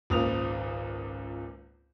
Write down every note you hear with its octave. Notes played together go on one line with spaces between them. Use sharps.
G#1 C#2 A#2 D#6 F7